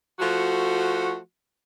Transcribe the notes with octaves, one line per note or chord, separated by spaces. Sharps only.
F3 A3 F#4